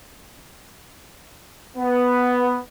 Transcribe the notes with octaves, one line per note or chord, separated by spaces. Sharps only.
B3